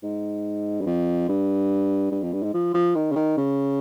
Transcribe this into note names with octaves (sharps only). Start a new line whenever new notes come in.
G#2
G2
F2
G2
G2
F2
G2
G#2
F3
F3
D#3
C#3
D#3
C#3